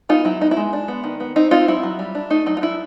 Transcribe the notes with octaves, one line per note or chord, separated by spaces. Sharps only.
B3 D#4 F4
F#3 E4
B3 D#4
E4
G#3
D4
B3
D#3
B3
C4 D#4
C4 D#4 F4
F#3 E4
F#3
G3
D4
A3 D#4
F#3 D#4
F4
D4 E4